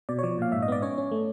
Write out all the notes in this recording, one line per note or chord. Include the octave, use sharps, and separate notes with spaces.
B2 D5
C#5
F3 D5
A#2 F5
G#2 E5
D#5
B3 D5
C#4 C#5
C#4
A3